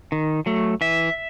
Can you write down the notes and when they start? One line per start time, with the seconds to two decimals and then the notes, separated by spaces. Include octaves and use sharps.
0.12 D#3
0.46 F#3 A3
0.81 E3 E5